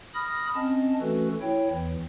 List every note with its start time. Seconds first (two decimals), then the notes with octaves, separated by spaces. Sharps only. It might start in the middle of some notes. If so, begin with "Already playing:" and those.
0.14 B5 D#6 F6 A#6
0.55 C4 C#4 D#5 A5
1.01 E3 A3 C#4 F#4 A4 B4
1.41 E4 C#5 G5
1.70 E2 E3